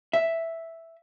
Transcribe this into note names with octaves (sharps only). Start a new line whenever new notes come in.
E5